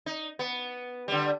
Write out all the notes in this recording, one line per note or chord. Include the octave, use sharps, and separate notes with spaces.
D#4
B3
D3 G3